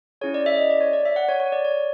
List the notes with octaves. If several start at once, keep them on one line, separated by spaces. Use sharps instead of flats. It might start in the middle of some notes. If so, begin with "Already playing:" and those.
C#4 E4 G#4 C#5
D5
E5
D#5
D5
C#5
D5
E5
F#5
C#5
C#5
D5
C#5